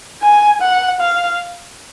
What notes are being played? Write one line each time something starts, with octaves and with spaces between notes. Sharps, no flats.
G#5
F#5
F5